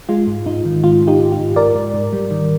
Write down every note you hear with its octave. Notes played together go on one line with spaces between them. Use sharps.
G#3 F4
G#2
G#2 D#4
D#3
G#2 F4
G#2
D#4 G4
G#2
F4
G#2
G#2 A#4 D5
G#2
G#2
G3
D#3